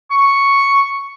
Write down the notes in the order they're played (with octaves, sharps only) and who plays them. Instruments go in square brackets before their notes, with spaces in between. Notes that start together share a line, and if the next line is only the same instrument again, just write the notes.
[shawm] C#6